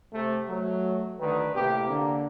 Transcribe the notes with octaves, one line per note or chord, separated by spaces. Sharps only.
C3 A3
F#3 A3
D2 D3 D#3 B4
A2 C3 A#3 G4
D3 A#3